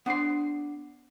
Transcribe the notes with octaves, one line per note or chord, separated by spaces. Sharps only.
B3 D4 C5 C6